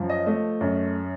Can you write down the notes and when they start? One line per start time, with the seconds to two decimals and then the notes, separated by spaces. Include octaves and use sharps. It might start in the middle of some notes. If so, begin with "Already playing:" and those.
Already playing: F#2 F3
0.09 D#5
0.26 A3 D#5
0.61 F#2